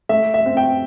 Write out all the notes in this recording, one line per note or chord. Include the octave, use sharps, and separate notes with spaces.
A3 E5
E5
C4
G5